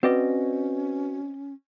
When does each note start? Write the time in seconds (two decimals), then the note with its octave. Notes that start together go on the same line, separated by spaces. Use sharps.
0.03 C4 C#4 F#4 B4 D5 D#5